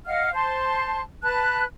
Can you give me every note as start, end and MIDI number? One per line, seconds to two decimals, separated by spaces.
0.06 0.30 75
0.06 0.30 77
0.06 0.30 78
0.06 0.30 89
0.33 1.01 72
0.33 1.01 81
0.33 1.01 84
1.23 1.64 71
1.23 1.64 81
1.23 1.64 90